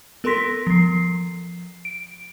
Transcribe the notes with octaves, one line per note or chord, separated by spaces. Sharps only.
B3 A4 A#4 C6 A#6 B6
F3 C7
D7